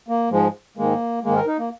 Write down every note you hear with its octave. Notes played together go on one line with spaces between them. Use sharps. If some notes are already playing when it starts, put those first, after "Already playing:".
A#3
G#2 F3 G#3
G#2 D#3 G#3 A#3
G#2 D#3 G#3 A#3
A#4
D#4
A#3